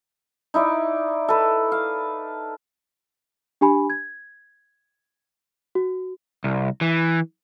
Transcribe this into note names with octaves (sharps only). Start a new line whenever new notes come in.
D#4 E4 D5
A4 B4
F5
D4 G4 G#5 B5
G#6
F#4
C2
E3